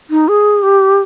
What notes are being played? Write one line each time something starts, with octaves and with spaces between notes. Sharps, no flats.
D#4
G#4
G4